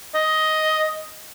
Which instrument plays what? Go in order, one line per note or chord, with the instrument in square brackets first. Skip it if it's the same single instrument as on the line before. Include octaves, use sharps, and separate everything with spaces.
[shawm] D#5